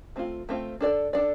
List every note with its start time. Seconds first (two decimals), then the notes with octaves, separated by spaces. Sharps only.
0.16 A3 C4 F4
0.49 A3 C4 F4
0.81 D4 A4 D5
1.13 D4 A4 D5